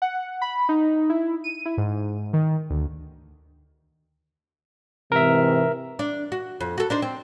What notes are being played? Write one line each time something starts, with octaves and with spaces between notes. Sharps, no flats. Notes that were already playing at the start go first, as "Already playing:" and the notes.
F#5
B5
D#4
E4
D#7
E4
G#2
D#3
D2
G#2 C3 E3 A#4 E5
D4
F#4
F2
F#4 A4
D4 D#4 C5
C4